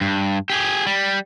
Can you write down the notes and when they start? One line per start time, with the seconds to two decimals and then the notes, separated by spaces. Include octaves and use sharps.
0.01 G2
0.50 G4 G#4
0.87 G3